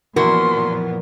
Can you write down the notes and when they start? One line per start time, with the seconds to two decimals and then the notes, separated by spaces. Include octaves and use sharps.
0.16 F#2 A#2 E3 F3 B3 F#4 A#4 C6